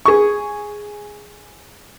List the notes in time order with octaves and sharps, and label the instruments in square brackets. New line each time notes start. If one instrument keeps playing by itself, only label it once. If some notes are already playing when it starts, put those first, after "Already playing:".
[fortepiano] G#4 C#6